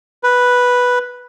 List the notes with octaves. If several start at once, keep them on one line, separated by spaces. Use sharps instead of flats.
B4